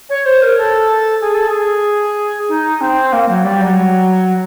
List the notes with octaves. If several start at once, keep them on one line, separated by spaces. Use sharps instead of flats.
C#5
C5
A#4
A4
G#4
A4
G#4
D#4
C4
A#3
F#3
G3
F#3